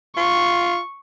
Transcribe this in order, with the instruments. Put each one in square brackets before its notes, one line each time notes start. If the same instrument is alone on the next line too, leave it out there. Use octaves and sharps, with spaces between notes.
[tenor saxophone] F4 [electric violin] C#6